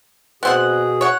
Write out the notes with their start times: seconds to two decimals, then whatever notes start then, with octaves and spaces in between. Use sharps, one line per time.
0.43 B2 B3 C4 G#4 F#5
1.01 C#5 F#5